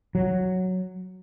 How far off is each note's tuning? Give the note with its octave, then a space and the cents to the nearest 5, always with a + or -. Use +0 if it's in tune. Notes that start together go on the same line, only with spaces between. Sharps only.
F#3 +0